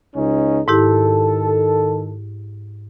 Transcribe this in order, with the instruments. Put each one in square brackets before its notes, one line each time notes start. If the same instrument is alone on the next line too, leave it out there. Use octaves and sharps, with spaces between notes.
[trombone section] C#2 C#4 D#4
[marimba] G#2 E4 G4 [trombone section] D#3 A4